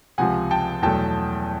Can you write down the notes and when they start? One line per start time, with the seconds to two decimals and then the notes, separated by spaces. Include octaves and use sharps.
0.18 C#2 C3 F3 F#5 G#5
0.51 G5 A5
0.82 E2 B2 F#3 A3 G5 A5